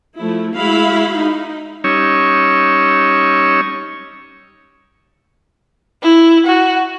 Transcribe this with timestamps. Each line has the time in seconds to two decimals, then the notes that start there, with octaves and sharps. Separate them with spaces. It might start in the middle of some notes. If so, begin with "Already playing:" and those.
0.16 F3 A3 E4
0.55 G#3 E4 F#4 E5 F5 B5
1.18 D#4
1.84 G3 C#4 D#4 C#5 E6
6.03 E4
6.46 F#4